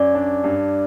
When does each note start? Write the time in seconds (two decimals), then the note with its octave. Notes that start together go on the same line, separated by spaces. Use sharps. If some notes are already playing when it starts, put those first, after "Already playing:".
Already playing: F#2 D5
0.15 D4
0.44 G2